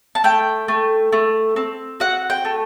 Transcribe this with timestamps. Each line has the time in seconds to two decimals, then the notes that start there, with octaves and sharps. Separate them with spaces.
0.15 A5
0.24 A3 G5
0.68 A3
1.12 A3
1.56 C4
2.00 F#4 F#5
2.30 G5
2.45 A3